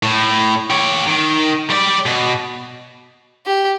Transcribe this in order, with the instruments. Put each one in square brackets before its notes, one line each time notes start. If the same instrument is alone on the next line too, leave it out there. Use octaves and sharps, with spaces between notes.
[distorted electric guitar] A2
G4 C#5
D#3
G3 D5
B2
[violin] G4